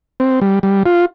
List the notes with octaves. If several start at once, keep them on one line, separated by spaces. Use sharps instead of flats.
C4
G3
G3
F4